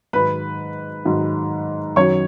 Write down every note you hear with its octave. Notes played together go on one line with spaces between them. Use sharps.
G#2 D#3 F#3 B4 B5
G#2 D#3 F#3
F#2 D#3 F#3 C#5 C#6